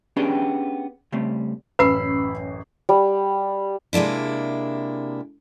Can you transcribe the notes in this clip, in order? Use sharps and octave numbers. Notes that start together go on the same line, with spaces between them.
B3 C#4 D4 G4 G#4 G5
C#3 G3 A3 C4
A1 F#2 B4 B5 E6 C7
G3
C3 G#3 A#3 D4 E4